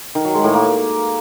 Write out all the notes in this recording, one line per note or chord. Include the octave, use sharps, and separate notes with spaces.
D#3
F#3
G#3
A2
A#3